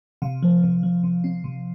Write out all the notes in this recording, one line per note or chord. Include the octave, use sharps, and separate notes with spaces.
C3 F5
F3
C3
F3
C3
C4
C3